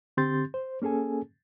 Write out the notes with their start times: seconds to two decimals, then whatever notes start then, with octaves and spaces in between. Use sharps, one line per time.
0.17 D3 C4 G4 C6 G6 A6
0.54 C5
0.82 A#3 C#4 G#4 A4 G#5